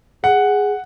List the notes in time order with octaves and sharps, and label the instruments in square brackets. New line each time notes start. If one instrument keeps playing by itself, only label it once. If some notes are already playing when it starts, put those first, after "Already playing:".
[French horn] G#4 [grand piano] F#5